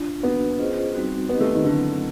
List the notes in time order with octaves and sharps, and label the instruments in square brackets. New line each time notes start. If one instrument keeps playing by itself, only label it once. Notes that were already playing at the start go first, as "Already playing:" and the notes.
Already playing: [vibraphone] D4 F4
[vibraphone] A#3 D4 F#4 [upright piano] B3
[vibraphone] C#4 F4 G#4 C5 D#5
G3 C4 D#4 F#4
[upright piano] B3 [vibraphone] C4 D#4 G4 B4 D#5
[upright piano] A3
D#3
[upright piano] D3 [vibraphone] F#3 A3 C4 E4